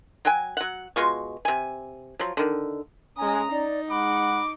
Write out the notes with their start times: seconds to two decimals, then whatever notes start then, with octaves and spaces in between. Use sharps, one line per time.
0.25 F#3 F#4 G5 G#5
0.57 F#3 F#5
0.96 B2 G#3 F4 C#6
1.45 C3 G#5
2.19 F3 F#3
2.37 D3 D#3
3.18 G#3 C#4 G#5 A#5 D#6
3.52 D#4 D5
3.90 G#3 F#5 B5 D6